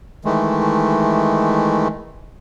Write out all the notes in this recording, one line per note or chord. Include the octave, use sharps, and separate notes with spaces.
D#3 E3 G#3 A3